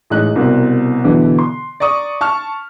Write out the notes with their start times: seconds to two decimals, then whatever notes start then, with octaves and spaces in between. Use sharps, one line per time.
0.10 A1 G#3 D#4 F#6
0.36 C2 B2 C4 A#4
1.04 B2 D3 E3
1.39 C6
1.80 D5 A#5 C#6 D#6
2.21 A5 C#6 F6